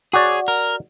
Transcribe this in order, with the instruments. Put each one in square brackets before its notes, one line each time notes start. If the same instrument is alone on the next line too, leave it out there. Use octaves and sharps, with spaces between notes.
[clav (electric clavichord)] F#4 D5 [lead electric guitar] G#4 C#5
[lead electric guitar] A#4